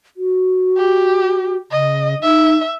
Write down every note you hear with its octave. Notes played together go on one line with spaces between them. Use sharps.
F#4
G4
C#3 D#5
D#4 E5